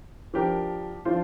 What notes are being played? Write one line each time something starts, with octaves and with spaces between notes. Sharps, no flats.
F3 D4 G4 A#4
F3 D4 F4 C5